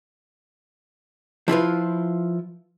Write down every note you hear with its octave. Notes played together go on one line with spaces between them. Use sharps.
F3 E4 F4 B4